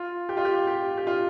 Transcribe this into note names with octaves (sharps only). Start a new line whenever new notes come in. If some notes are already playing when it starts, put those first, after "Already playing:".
Already playing: F4
G4
F4
G4
G4
G4
F4